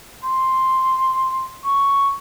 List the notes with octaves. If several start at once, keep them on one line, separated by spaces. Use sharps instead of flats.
C6
C#6